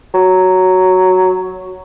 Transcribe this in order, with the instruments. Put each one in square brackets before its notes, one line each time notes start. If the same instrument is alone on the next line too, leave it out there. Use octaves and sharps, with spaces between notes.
[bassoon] F#3